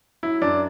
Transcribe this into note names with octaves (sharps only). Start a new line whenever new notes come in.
F#3 E4
F#2 D4